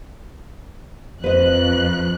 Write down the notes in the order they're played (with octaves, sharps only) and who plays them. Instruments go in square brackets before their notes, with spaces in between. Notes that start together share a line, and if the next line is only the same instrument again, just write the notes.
[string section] F2 F#6 [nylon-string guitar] B4 C5 D#5